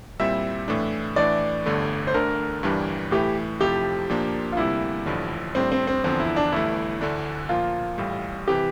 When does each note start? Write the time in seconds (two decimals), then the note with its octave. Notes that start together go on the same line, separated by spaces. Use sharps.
0.20 A#2 G3 C4 E4 E5
0.68 A2 E3 A3 D4
1.16 A2 E3 A3 D4 D5
1.66 G1 G2 D3 A3
2.07 C5
2.14 D2 D3 A3 D4 A#4
2.63 G1 G2 E3 G3 D4
3.11 A2 E3 A3 E4 G4
3.60 F2 C3 F3 A3 E4 G4
4.09 A#2 F3 A#3 D4
4.52 F4
4.57 D2 C3 G3 A#3 E4
5.06 A1 G2 D3 F3
5.55 A2 G3 C4 D4
5.72 C4
5.87 C4
6.04 E2 D3 F3 C4
6.20 E4
6.36 D4
6.52 G1 G2 E3 A3 E4
7.01 D2 D3 A3 D4
7.49 A#2 F3 A#3 F4
7.98 A1 A2 G3
8.48 C3 E3 G4